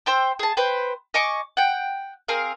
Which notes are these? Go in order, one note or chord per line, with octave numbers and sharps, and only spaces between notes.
C5 G5 E6
G#4 A5
B4 C5 G5
D#5 G#5 C#6 D6
F#5 G5
C4 G#4 A#4 F5